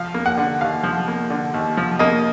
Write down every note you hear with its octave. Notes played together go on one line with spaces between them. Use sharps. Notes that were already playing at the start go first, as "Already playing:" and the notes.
Already playing: F3 F5
A#3
F#5
D3
D#2 F5
F3
A#3
D3
D#2
F3
A#3 D#5